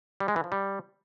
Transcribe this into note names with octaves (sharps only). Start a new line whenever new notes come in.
G3
G#3
E3
F3
G3